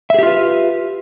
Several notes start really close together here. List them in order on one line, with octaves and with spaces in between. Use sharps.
E5 G#4 G4 F4 B4